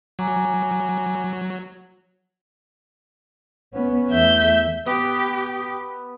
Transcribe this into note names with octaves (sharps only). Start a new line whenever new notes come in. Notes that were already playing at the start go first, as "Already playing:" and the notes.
F#3 G#5 A#5 D6
B3 C#4
E2 A3 E5 G6
B3 G4